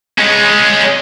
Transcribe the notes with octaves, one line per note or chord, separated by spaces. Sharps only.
G#3 C#4